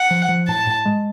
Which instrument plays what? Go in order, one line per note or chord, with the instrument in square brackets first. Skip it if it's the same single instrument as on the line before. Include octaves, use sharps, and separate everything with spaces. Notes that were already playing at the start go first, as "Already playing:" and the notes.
Already playing: [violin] F#5
[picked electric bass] F3
F3
[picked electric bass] A2 [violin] A5
[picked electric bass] A2
G#3